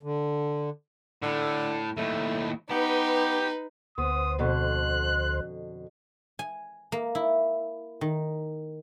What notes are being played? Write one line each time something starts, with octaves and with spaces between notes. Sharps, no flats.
D3
A2 D3
D#2 A2 A3
B3 D#4 G4 B4
D2 B3 C5 D#6
F2 B2 D3 F#6
G#5
A#3
E4
D#3